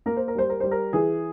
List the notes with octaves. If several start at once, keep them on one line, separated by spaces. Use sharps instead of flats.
A#3 A#4
C5
A#4
G3 C5
A#4
G3 C5
A#4
E3 G#4